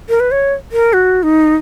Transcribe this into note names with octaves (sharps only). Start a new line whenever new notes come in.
A#4
B4
C#5
A#4
F#4
D#4